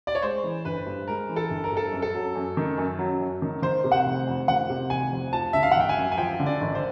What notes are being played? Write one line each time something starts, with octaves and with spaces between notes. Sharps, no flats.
D5
C#5
G#3 C5
E3
G1 B4
G2
G#3 A#4
E3
A4
G1
A#4
G2 A4
F#2
A4
F#3
F#2
D#3
F#2
F#3
F#2
D#3
D#3 C5
C3
F#5
F1
F2
D#3 F#5
C3
F1 G#5
F2
F3 A5
D3 E5
F5
G#1 F#5
G5
G#5
F#2
G#5
F3 G5
D3
D5
G#1
C5